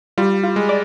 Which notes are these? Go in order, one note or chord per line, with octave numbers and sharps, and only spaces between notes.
G3 F4
F4
G#3
D5